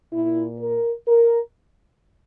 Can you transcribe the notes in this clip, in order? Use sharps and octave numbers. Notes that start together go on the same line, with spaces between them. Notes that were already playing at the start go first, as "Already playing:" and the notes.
A#2 E4
A#4
A#4